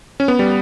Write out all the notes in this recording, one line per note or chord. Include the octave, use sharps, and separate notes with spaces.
C#4
B3
G3